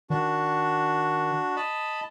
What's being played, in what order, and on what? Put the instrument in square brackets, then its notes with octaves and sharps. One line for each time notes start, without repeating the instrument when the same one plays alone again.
[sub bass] D#3 [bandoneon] D4 F#4
[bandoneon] D#5 A5 B5